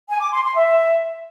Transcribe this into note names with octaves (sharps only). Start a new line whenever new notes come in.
G#5
D6
C6
C6
E5